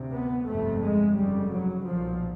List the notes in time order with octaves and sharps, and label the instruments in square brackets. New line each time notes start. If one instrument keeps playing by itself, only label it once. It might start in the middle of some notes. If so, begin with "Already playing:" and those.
Already playing: [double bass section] D2 C3
B3
G1 F2 C3 A3
G#3
F1 F2 C#3 G3
F#3
B1 A#2 F3